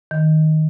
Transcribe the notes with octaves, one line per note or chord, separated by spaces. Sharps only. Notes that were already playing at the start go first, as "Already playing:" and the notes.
D#3